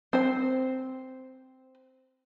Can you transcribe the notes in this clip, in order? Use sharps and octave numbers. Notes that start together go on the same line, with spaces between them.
C4 C5